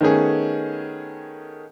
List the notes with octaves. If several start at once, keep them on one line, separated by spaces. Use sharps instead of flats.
D#3 A3 B3 C#4 G#4